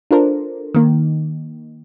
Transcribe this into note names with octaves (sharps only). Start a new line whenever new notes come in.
D4 F4 A4 A#4 C5
D#3 A#3